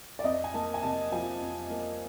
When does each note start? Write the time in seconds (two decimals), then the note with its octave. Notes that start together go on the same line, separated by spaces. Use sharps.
0.19 D5
0.24 F2 D#5
0.44 G#5
0.54 A#3 A5
0.74 G#5
0.82 C3 A5
1.12 F3 G#5
1.41 F2
1.70 A#3